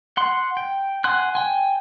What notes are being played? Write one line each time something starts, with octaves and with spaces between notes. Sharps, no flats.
F#5 C6
G5
F#5 G#5 C6 F#6
G5 G#5